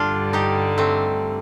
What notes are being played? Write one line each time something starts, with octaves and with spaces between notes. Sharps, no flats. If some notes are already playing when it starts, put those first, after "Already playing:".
Already playing: G2 D3 G3 D4 F4
D#4 G4
A3 C4